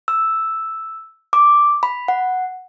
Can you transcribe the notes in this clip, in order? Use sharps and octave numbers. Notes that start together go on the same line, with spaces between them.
E6
D6
B5
F#5